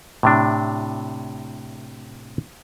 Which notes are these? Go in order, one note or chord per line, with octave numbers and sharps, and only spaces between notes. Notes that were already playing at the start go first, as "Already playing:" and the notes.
A2 C3 D4